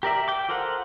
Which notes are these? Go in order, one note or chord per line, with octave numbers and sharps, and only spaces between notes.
G4 A#4 D5 E5
G5 D6
F4 A4 A#4 C5 F#5